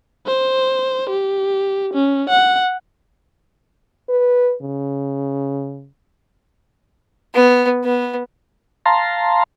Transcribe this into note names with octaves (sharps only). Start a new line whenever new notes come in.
C5
G4
C#4
F#5
B4
C#3
B3
B3
F5 A5 A#5 C6